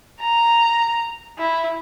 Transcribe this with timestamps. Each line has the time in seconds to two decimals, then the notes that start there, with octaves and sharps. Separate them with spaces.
0.21 A#5
1.38 E4